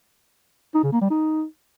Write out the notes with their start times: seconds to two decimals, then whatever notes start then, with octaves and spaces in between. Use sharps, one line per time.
0.75 D#4
0.83 C#3
0.92 A#3
1.01 G3
1.10 D#4